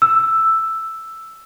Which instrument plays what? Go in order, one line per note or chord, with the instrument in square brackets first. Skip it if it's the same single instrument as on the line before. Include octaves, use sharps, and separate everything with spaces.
[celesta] E6